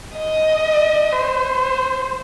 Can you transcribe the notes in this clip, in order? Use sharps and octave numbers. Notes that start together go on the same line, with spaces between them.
D#5
C5